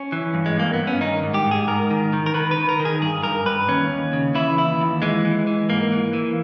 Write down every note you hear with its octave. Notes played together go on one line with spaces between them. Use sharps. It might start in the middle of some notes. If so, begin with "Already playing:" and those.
Already playing: C#4
E3
G2
G#3
G2 A#3
B3
G2
C#4
D#3 D#4
G#2
G4
G#2
G#4
G#2 A#4
D#3
D#3
A#4
D#3 B4
B4
D#3
A#4
D#3
G#4
G2 G#4
G2 A#4
G2 B4
D#2 C#4
D#2
C#3
E3 E4
D#2 E4
D#2
E3 G#3
E3
E3
G#2 A#3
E3
E3